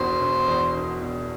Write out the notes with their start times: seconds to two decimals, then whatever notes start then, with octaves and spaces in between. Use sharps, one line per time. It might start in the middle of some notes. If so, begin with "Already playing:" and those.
Already playing: E1 E2 B2 C5
0.20 E1
0.48 E2
0.74 E1
1.02 B2